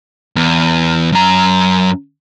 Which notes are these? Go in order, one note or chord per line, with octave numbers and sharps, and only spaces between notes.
E2
F#2 A#5